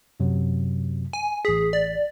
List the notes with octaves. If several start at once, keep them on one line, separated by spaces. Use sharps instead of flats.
F#2 C3 F#3
G#5
A1 G#4 B6
D5